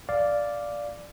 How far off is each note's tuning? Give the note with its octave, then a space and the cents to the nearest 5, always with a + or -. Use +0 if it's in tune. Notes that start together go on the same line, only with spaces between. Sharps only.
D5 +0 F5 +0